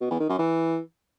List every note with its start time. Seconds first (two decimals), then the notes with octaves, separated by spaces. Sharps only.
0.01 B2
0.10 E2
0.20 D#3
0.29 F#2
0.38 E3